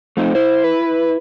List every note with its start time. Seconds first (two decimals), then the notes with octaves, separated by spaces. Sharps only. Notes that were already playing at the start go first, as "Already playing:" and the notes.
0.17 F3 A3 C4 D#4
0.35 E4 C5
0.64 B4